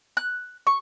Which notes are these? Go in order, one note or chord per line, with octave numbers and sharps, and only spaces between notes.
F#6
C#6